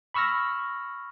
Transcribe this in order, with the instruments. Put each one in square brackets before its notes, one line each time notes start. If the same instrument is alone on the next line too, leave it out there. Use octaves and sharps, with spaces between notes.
[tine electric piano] B5 C#6 E6 F6 A#6